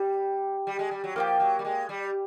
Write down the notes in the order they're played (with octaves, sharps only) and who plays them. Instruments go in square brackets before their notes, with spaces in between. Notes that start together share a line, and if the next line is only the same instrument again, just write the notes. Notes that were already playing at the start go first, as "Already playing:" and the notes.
Already playing: [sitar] G3
G3
G#3
G3
F#3
[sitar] F3 [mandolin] A#3 D#4 G4
[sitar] F#3
G3
G#3
G3